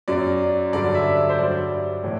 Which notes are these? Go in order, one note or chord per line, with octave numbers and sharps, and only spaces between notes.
F#2 F#3 D5
G2 D3 F#3 D5
E5
E5
C5
G2 F#3 D5
A2 E3